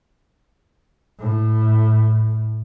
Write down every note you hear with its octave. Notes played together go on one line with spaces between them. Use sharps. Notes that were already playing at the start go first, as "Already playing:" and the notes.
A2